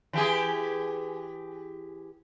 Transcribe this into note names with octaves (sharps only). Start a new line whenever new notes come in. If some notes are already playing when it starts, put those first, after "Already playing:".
E3 G4 G#4